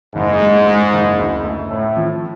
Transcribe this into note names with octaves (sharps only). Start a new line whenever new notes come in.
F#1 G#2
G#3
G#3
F#1
D2
A3
A2 A3
F3